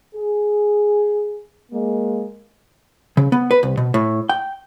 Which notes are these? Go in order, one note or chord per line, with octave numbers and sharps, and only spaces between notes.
G#4
G#3 A#3
C#3
B3
B4
C2
B2
A2
G5